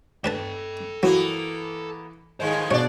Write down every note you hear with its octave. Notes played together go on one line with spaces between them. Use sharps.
D4 A4 B4 G5 A5
E3 F#3 A#3 B3
G#2 D#3 G#3 C5 F5
B2 D4 C#5 D5